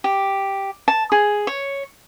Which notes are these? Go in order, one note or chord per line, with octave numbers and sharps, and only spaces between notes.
G4
A5
G#4
C#5